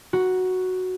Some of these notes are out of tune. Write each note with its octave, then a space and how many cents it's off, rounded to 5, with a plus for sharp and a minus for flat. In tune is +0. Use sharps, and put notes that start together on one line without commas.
F#4 +0 A#5 +30